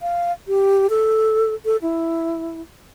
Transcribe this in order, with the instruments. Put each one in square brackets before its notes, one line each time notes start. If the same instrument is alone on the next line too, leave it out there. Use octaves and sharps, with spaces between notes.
[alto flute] F5
G4
A4
A4
E4